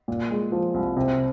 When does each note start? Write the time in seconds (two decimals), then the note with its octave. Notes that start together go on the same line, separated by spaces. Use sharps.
0.08 A#2
0.30 G#3
0.52 F3
0.74 C2
0.97 C3